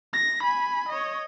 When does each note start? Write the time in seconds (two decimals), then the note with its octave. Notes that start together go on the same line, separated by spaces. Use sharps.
0.13 A#6
0.44 G#5 B5
0.89 C#5 D#5